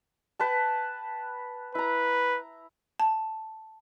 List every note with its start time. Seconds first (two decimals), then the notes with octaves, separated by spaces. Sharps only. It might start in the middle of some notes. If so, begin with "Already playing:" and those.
0.40 B4 G5 A5
1.75 E4 B4 A#5
3.00 A5